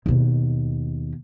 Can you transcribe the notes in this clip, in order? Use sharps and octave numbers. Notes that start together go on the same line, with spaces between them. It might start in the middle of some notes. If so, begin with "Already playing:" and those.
D#2 B2